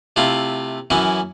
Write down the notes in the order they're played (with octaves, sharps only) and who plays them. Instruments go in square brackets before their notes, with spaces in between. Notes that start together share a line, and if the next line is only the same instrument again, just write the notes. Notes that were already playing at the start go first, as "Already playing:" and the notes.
[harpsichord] C3 A3 E4 F4
F#2 E3 C#4 E4